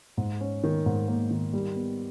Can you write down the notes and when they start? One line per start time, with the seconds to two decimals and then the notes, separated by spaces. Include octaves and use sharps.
0.17 G#2
0.41 C#4
0.64 D#3
0.86 G#2
1.08 A#3
1.31 D#3
1.53 G3
1.76 B3